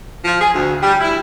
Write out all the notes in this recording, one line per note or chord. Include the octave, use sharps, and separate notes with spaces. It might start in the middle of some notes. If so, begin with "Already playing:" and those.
F3
G#4
D2
G3
E4